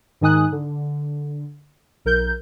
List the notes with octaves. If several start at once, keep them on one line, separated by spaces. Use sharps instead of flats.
G#2 D#3 D#4 G#5 D#6 F#6
D3
B1 A#4 G6